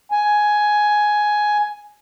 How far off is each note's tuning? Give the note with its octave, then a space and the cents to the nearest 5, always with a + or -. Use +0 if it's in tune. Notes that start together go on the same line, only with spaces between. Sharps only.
G#5 +10